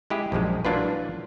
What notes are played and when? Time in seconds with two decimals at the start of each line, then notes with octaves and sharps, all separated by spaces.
0.10 G#3 E4 G4 G#4
0.32 A#1 F#2 F3 G#3
0.65 E3 F#3 A#3 D4 F4 B4